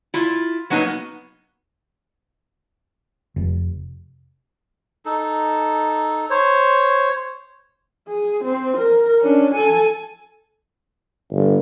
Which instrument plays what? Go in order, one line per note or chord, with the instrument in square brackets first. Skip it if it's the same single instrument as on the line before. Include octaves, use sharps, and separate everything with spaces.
[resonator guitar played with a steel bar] E4 F4
F#3 A#3 B3 D#4
[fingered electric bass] F1
[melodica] D#4 A4
C5 C#5
[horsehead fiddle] G#4
C4
A#4
C#4 D4
A4 G#5
[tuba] G1